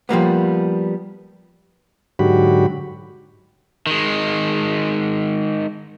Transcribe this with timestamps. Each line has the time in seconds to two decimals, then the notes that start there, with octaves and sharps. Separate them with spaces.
0.09 F3 G3 A#3 B3
2.19 G#2 D3 F#3 F#4 G4 B5
3.87 D#3 G#3